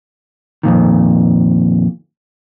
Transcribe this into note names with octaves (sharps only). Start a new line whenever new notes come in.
F2 A#2 D#3